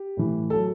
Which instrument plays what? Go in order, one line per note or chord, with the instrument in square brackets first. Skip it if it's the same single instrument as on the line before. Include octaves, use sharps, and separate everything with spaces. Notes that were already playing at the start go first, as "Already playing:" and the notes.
Already playing: [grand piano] G4
A2 E3
F#3 A4